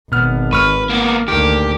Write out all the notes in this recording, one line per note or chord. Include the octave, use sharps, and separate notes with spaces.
G#1 B2 B3 F6
G#2 B4 C#6 F6
A#3 B3
D2 D#3 A#3 G4